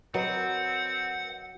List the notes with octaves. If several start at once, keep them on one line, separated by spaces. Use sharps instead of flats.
F#3 C4 A#4 B4 D#5 F#5